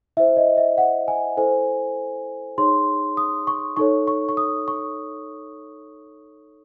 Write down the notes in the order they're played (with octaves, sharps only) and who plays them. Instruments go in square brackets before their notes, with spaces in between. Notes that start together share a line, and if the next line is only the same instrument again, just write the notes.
[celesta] E4 C5 E5
D#5
E5
F#5
G#5
E4 A4 C5 G#5
D#4 G#4 C#5 C6
D#6
C#6
D#4 A4 C#5 C#6
C#6
C#6
D#6
C#6